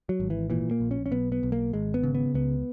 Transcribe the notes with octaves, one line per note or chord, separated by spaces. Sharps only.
F#3
G#1
E3
A#2 E3
A#3
A#1
C#4
C#4
B1 B3
B3
B1
A#3
G#1 G#3
B3
C#3
B3
C#2 B3